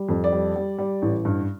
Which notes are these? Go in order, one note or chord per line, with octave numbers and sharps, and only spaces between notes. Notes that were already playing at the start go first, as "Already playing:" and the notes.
Already playing: G3
F2
D5
G3
G3
G3
A1
G2